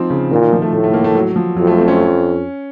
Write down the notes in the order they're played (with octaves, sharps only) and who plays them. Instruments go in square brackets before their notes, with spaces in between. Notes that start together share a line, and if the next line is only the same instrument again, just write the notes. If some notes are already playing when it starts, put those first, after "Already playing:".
Already playing: [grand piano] F3 C4 D#4 F4
C#3
[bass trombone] A#2 [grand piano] D#3
[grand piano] D#3
F3
A3
[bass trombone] A2 [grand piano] A3
[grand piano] A3
A#3
A3
F#3
F3
[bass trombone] F2 [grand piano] F#3
[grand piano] A3
C4
C#4